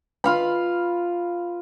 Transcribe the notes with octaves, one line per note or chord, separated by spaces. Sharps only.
F4 F5 B5